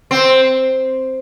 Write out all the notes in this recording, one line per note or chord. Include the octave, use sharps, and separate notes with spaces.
C4